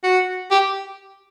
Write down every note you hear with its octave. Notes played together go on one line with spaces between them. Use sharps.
F#4
G4